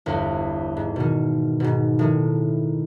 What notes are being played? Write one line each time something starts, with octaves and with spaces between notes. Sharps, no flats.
G1 E2
G#2
B2 D#3
G#2 B2
A2 D#3